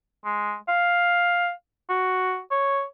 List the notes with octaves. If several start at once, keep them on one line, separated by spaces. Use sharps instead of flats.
G#3
F5
F#4
C#5